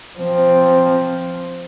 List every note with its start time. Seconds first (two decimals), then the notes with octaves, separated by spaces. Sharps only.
0.19 F3 C4